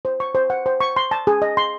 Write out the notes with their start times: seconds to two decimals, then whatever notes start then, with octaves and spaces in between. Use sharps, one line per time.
0.05 C5
0.20 C#6
0.35 C5
0.50 F#5
0.66 C5
0.80 C#6
0.97 C6
1.11 A5
1.27 G#4
1.42 D#5
1.57 C6